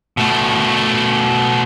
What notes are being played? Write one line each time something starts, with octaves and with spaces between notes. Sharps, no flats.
B2 A3